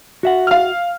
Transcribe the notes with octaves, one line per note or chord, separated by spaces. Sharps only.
F#4 E5 F#5
F5 F6